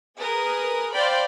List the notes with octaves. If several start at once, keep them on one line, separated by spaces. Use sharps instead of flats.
G#4 A#4 B4 D#6
C5 D5 F5 G5 B5